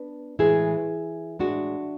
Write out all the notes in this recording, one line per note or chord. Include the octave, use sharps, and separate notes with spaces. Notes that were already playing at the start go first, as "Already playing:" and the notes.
Already playing: B3 D4
A2 E3 G#3 E4 G#4
A2 G#3 D4 F#4